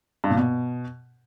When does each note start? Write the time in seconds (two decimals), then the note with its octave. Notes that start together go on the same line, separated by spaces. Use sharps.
0.24 G2
0.30 A#2
0.37 B2